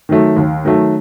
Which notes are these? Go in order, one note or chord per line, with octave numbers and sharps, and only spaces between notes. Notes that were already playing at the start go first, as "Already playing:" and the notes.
D#3 F#3 A3
D#2
D#3 F#3 A3